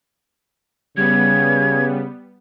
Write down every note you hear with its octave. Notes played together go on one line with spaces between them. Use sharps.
C#3 G3 B3 G#6